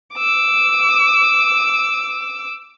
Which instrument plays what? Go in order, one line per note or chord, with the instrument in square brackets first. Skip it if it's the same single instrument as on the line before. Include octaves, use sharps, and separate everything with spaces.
[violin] D6 E6